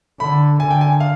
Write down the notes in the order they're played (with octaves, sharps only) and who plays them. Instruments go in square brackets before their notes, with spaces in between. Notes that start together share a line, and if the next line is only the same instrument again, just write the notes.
[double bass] D3 [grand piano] B5
[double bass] D3 [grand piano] G#5
[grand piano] G5
G#5
F5